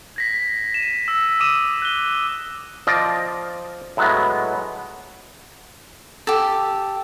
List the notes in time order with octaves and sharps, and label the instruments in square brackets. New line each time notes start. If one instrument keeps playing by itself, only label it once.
[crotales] G#6 A#6 B6
D#7 E7
E6 B6
D6 D#6 D#7 E7
F#6 G7
[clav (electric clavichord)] F3 F4 D5 D#5
A2 F#3 G#3 B3
[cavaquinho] G4 A4